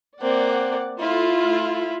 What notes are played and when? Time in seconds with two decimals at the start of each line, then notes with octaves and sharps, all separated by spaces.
0.22 A#3 C4 D5 F#5
1.00 A3 E4 F4